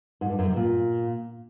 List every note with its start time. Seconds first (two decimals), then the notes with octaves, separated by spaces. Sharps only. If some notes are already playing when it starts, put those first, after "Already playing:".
0.21 G#2
0.30 G2
0.39 F#2
0.47 C3
0.56 A#2